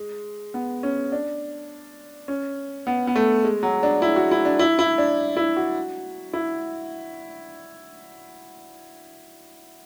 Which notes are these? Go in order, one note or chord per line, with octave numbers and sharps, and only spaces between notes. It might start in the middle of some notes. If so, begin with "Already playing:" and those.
Already playing: G#3
B3
C#4
D4
C#4
B3
B3
A3
G#3
F#3
D4
E4
F#4
E4
D4
E4
E4
D4
E4
F#4
E4